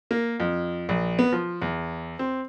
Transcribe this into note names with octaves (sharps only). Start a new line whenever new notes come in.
A#3
F2
A#1
B3
F3
E2
C4